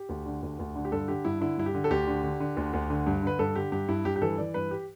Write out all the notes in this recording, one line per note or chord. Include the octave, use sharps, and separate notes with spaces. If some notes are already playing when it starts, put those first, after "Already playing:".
Already playing: G4
D2
D3
D2
D2
D3
G4
G2 A4
D3 G4
G2 E4
D3 E4
G2 E4
G4
D3
A4
D2 G4
D3
D3
D3
D2
D2
D3
G2
D3 B4
G2 A4
D3 G4
G2 G4
G2 E4
G2 G4
G4
E3 A4
E3 D5
G2 B4
G4